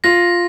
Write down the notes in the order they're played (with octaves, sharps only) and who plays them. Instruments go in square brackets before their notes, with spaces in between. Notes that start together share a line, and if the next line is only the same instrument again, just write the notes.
[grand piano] F4 [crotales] A#6